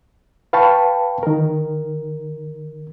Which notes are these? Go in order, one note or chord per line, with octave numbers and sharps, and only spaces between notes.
B4 F5 G5 A5 B5 C#6
D#3 A#4